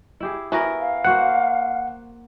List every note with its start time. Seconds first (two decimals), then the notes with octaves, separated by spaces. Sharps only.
0.20 E4 G4 G#4
0.52 E3 B3 F#4 A#4
0.80 F5
1.05 A#3 F#4 C5 F#5